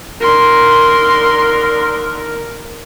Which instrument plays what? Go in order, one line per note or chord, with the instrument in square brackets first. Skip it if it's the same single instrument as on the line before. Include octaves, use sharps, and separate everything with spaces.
[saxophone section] D#2 D3 A#4 [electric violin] C6